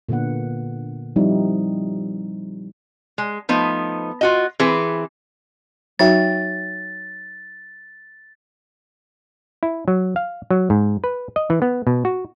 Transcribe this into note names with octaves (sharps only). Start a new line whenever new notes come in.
A#2 D3 A#3 B3 F#5
F3 G3 C4 D#4 E4
G#3
F3 A3 B3 D#4
F4 F#4 D#5
E3 C4 G#4 B4
F#3 D#4 F#4 C#5 E5 G5 A6
E4
F#3
F5
F#3
G#2
B4
D#5
E3
B3
B2
F#4